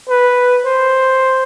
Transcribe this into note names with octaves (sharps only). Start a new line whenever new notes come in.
B4
C5